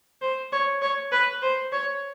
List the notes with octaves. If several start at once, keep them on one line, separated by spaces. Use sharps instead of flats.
C5
C#5
C#5
B4
C5
C#5